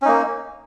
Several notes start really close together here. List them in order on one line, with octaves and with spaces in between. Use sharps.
C#4 D#4 A#3